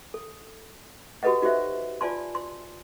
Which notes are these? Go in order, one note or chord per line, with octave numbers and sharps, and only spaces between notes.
A4
F#4 G4 A4 B4 D#5 F#5
D#4 F#4 G4 C5 E5
F4 D5 G#5 A5 C6
C6